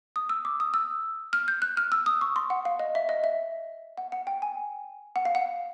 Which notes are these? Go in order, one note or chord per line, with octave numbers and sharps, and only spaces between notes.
D#6
E6
D6
D#6
E6
F6
G6
F#6
F6
E6
D#6
C#6
C6
F#5
F5
D#5
E5
D#5
E5
F#5
F#5
G5
G#5
F#5
F5
F#5